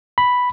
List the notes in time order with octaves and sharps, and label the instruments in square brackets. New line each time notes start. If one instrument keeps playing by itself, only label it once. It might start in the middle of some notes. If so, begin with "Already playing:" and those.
[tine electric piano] B5